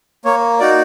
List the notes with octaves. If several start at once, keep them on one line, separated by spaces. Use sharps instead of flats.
A#3 C#5
D#4 F#4 D5